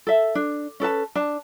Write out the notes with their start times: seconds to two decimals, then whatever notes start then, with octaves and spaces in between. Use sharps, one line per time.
0.07 A4 E5
0.35 D4
0.80 C#4 A4 B4 A5
1.15 D4 A5